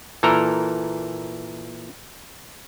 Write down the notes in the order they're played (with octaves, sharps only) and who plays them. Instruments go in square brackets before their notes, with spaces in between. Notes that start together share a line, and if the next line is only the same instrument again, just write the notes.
[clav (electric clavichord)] A#2 E3 A4 A#4 A#5